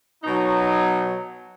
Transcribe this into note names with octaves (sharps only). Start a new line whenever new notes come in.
B2 F#3 D#4